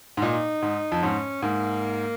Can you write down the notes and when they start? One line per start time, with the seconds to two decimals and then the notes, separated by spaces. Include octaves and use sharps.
0.17 G#2
0.22 A#2 D#4
0.62 G#2
0.92 F2
1.03 G#2 C#4
1.42 G#2 A#3